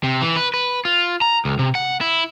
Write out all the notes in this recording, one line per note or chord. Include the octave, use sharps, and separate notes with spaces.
C3
E3
B4
B4
F4
A#5
C#2
C3
F#5
E4